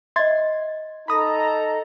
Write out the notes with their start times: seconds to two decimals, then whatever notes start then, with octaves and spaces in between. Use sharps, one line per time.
0.16 D#5 E5 C6 G#6 A6
1.08 D#4 A4 A#5 B5 D#6 A#6